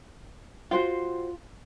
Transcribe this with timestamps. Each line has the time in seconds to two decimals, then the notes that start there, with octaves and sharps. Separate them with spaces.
0.71 F4 F#4 C5 G5